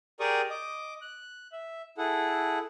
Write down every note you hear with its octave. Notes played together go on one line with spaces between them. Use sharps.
G4 G#4 A#4 D5 C#6 D#6
D#5 D6
F#6
E5
E4 G#4 A4 F#5